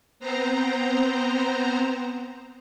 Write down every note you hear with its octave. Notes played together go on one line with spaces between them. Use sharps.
B3 C4 C5 A#5